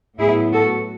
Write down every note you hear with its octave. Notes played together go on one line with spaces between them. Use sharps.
A2 F#3 B3 E4 G#4
F#4 A4